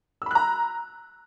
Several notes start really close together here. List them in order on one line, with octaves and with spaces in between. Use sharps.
E6 B5 F#6 A#5